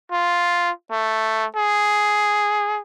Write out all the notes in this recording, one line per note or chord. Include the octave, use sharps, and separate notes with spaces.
F4
A3
G#4